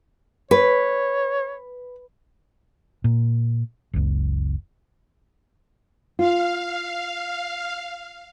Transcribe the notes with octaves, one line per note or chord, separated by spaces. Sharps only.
B4 C#5
A#2
F#1 C#2
F4 F5